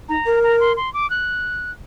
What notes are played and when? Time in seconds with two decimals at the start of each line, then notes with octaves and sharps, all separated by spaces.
0.09 D#4 A#5
0.26 A#4
0.43 A#5
0.60 C6
0.77 C6
0.94 D6
1.10 F#6